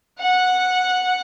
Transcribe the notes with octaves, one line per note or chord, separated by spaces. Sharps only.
F#5